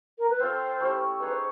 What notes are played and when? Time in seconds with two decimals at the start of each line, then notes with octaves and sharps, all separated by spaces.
0.19 A#4
0.30 B4
0.40 C4 F4 A4 C5
0.80 A3 C#4 E4 G4
1.20 D#4 G#4 B4 C#5
1.32 C5